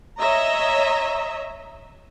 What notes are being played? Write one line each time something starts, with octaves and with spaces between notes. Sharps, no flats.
C#5 D#5 E5 A#5